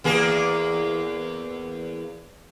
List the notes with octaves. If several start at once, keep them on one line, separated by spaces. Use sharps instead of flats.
E2 A#3 G#4